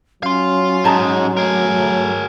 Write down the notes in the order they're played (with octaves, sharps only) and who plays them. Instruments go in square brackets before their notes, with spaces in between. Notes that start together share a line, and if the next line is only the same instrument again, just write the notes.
[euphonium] F#3 [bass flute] C#4 [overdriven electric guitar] F5 C6
[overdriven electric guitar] G#2 G#3 [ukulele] C#5 A5 A#5
[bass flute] A3 [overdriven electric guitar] G#4 A#4